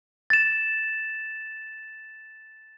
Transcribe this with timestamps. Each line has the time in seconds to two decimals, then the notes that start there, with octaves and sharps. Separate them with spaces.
0.30 A6 E7